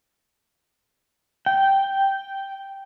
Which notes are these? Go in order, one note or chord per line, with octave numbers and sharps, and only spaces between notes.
G5